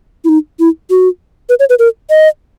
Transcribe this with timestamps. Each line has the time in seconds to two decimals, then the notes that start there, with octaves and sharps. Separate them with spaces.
0.24 E4
0.29 D#4
0.59 E4
0.90 F#4
1.49 B4
1.59 C#5
1.69 B4
1.79 A#4
2.10 D#5